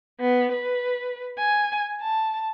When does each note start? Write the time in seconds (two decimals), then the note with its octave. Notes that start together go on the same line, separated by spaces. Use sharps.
0.20 B3
0.52 B4
1.38 G#5
2.01 A5